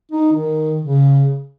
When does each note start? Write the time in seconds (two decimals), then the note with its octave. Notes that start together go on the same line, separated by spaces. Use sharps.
0.11 D#4
0.33 D#3
0.81 C#3